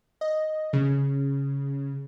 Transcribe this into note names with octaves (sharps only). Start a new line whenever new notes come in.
D#5
C#3